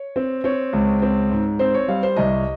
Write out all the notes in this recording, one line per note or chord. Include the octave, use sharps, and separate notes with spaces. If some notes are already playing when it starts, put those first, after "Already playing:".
Already playing: C#5
C4
C4 C#5
C#2
C4
G#2
C4 C5
C#5
G3 F5
C5
C2 D#5